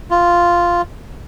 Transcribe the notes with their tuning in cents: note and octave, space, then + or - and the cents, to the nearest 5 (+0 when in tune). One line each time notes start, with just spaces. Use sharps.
F4 -5